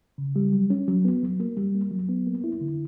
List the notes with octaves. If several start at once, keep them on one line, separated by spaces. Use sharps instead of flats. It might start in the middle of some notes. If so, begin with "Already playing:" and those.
C#3
G3
F#3
C#4
F#3
B3
F#3
A#3
G3
A#3
F#3
B3
A#3
E4
D3